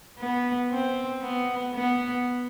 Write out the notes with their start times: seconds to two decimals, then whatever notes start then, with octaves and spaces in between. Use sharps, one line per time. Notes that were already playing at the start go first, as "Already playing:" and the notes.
0.19 B3
0.71 C4
1.22 B3
1.75 B3